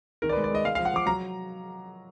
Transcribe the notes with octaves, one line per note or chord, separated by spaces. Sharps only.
D#3 A#4
D5
B4
G#3
D5
G#3 D#5
G#3 F5
F5
F3
F#5
F3 D6
F#3 A#5